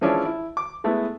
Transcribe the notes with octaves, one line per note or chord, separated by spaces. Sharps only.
E3 F3 G#3 C#4 D4 E4
E4
D6
G#3 A3 B3 E4